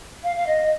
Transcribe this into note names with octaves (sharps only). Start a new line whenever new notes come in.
F5
F5
D#5